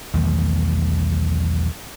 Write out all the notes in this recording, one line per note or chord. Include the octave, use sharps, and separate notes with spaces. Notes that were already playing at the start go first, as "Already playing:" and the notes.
B1 E2 D#3 A3